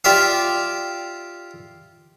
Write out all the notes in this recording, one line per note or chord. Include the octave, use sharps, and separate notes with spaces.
F4 G4 D5 E5 F5